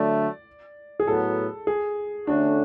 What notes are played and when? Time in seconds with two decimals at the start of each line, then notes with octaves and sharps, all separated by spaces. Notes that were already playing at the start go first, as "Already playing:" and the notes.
Already playing: D3 F#3 A3 D5
1.00 G#4
1.07 A2 F#3 B3 A4
1.67 G#4
2.27 D3 A3 C#4 D4 F#4